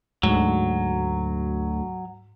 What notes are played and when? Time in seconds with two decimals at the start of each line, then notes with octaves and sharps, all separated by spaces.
0.23 D2 G#2 F#3